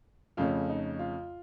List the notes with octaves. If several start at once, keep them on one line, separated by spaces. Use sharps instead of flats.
F2 C#3 A3 C#4 F4
D#4
F4